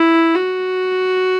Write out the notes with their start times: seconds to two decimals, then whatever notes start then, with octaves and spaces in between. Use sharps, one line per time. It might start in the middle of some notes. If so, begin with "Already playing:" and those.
Already playing: E4
0.35 F#4